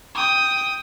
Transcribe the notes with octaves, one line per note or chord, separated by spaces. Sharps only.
G5 D#6